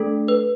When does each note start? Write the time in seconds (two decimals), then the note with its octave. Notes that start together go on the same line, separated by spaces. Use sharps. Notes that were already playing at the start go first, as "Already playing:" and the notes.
Already playing: A3 D4 A4
0.28 B4